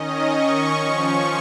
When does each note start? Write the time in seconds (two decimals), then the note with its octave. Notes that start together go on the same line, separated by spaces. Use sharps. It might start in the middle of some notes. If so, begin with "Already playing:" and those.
Already playing: D#3 C#4 D#5
0.27 C#6
0.73 F3 C#4 C#6